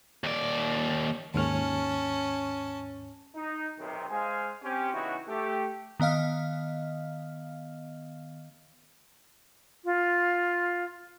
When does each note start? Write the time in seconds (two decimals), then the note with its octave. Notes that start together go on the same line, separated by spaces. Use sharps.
0.24 D#2 D5
1.34 D#2 G#2 C#4 A5 F6
3.36 D#4
3.78 B1 C3 D#3
4.10 G#3 C5 F5 G#5
4.62 C4 C#4 G4
4.93 C#3 E3 B3 D#4 E4 F#4
5.28 A3 G4
6.00 D#3 B3 D#5 F5 F6
9.85 F4